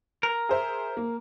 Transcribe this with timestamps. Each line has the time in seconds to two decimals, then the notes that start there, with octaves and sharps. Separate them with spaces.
0.23 A#4
0.49 G#4 C5 E5
0.97 A#3